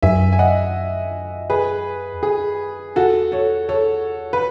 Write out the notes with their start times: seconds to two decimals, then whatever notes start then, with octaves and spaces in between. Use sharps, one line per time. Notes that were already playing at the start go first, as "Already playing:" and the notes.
0.03 F#2 E5 G#5
0.33 G#5
0.39 D#5 F#5
1.50 G#4 B4
2.12 E2
2.23 F#2 G#4
2.96 E2 F#4 A4
3.32 A4 C#5
3.69 A4 C#5
4.33 B4